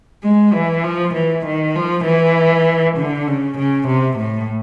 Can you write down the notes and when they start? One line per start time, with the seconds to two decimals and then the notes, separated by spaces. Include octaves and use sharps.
0.23 G#3
0.53 E3
0.84 F3
1.14 E3
1.45 D#3
1.75 F3
2.05 E3
2.98 D3
3.27 C#3
3.58 C#3
3.88 C3
4.19 A2